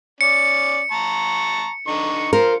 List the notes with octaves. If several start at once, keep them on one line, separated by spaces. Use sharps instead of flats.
C#4 D5 C#7
A5 A#5 C#6
D3 D#4 C#6
F4 A#4 C5